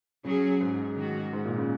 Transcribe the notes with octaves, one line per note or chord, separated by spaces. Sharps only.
C#3 F#3 C#4 G#4
G#2
D#3 G#3 F#4
G#2
A#2
C#3